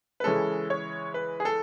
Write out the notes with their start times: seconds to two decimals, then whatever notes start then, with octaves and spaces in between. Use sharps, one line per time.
0.20 B4
0.24 C#3 E3 G#3 C#4 A4
0.70 C#5
1.14 B4
1.40 G#4
1.45 A4